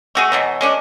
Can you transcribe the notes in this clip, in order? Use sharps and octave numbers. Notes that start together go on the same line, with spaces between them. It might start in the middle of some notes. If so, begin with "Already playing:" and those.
A3 F#4 G#4
B2 E3 F#3
G#3 C#4 D4